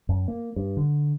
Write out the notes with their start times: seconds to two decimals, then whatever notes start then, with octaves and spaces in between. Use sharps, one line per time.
0.09 F#2
0.28 A#3
0.56 G2
0.77 D3